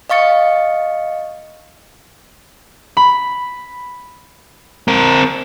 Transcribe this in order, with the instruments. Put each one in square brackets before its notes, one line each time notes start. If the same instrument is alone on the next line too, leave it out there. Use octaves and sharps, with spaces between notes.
[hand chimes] D#5 F5 C#6 A6 C#7
[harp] B5
[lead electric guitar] C4 A#4